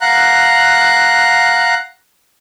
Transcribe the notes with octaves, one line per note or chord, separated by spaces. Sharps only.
F5 F#5 A#5 F#6